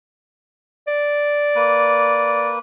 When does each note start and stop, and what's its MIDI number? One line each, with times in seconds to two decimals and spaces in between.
0.87 2.52 74
1.55 2.59 58
1.55 2.59 71